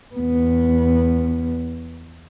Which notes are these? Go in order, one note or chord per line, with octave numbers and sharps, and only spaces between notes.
E2 B3